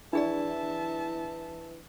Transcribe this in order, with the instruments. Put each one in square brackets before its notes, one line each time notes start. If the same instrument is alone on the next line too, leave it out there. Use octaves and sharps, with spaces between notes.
[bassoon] E3 [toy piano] D4 G#4 D5 [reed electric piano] E4 [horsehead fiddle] E5 A5